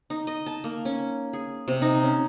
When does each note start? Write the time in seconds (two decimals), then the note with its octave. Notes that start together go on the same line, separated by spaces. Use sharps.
0.10 D#4
0.27 D#5
0.46 A5
0.64 A#3
0.85 C#4
1.33 G#4
1.68 C3
1.82 D#4
2.03 C#4